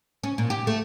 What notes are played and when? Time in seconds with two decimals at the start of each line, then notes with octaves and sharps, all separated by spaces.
0.24 C#4
0.38 A#2
0.50 G4
0.67 A3